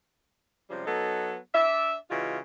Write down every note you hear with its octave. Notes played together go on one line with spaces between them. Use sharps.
C3 F3 G3 G#3 C#4
F#3 B3 D#4 A4
D4 D5 E5
C#3 E3 G#3 F4 F#4